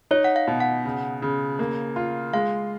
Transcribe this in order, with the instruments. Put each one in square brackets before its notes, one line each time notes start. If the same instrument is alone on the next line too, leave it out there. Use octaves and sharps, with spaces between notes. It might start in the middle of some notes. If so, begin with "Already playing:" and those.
[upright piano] D#4 [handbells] C#5
[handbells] F#5
F5
[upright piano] B2
[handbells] F#5
[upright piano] C#3
C#3
A#3
F4
[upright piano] G#3 [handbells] F5